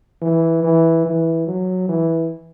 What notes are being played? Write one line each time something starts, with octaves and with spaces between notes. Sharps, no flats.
E3
E3
E3
F#3
E3